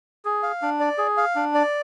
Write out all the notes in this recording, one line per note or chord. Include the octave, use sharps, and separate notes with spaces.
G#4
F5
D4
D5
G#4
F5
D4
D5